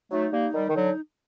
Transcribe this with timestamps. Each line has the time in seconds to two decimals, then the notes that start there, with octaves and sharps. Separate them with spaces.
0.11 F#3 A3 D#4
0.32 G3 A#3
0.54 D#3 G3
0.68 D#3
0.75 D3 F#3